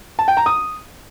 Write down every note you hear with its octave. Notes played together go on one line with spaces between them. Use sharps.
A5
G5
A#5
D#6